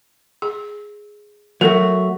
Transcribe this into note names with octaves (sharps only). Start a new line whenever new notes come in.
G#4
F#3 A3 F#4 A#4